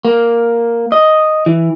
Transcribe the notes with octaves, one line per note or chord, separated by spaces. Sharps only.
A#3
D#5
E3